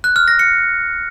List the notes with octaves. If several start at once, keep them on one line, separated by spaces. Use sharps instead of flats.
F#6
F6
A#6
C#7